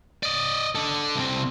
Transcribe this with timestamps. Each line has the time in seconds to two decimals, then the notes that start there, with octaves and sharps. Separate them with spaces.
0.23 D5 D#5
0.75 D4 A4
1.16 C2 C4